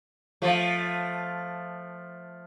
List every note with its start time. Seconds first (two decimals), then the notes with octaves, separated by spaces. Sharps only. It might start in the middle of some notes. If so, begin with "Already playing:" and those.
0.42 F3 A3